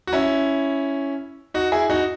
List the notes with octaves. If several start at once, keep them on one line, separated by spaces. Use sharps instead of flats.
F#4
C#4 E4
D#4 F#4
E4 G#4
D#4 F#4